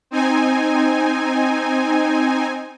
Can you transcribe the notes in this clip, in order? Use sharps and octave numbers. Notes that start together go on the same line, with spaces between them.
C4 D#4 G#5